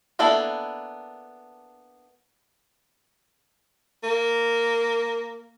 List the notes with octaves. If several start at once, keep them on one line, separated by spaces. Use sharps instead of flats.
A#3 B3 D4 E4 A4
A#3